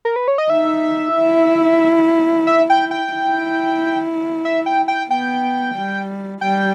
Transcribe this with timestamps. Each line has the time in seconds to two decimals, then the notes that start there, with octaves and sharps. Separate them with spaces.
0.05 A#4
0.16 B4
0.28 C#5
0.38 D#5
0.50 D#4 E5
1.16 E4
2.47 E5
2.70 G5
2.91 G5
3.13 E4
4.45 E5
4.66 G5
4.88 G5
5.10 B3 G5
5.75 G3
6.41 G3 G5